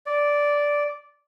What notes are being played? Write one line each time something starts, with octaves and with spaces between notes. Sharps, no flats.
D5